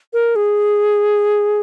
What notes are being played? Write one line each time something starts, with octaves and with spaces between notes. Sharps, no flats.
A#4
G#4